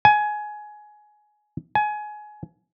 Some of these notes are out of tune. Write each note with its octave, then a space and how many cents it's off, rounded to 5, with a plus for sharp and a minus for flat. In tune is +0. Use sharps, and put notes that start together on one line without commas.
G#5 +20
G#5 +25